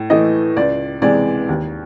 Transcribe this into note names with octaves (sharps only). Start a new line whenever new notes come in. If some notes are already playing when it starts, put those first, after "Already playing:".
Already playing: A2
E3 A3 D#5
C#2 D5
C3 E3 G#3 D5
D#2